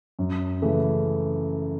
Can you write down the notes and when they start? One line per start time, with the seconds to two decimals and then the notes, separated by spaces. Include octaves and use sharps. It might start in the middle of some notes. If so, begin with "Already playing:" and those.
0.19 F#2
0.62 C#3 E3 A3